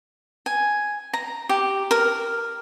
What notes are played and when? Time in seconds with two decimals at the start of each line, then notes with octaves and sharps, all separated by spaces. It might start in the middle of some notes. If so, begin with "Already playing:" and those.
0.46 G#5
1.13 A#5
1.49 G4
1.91 A#4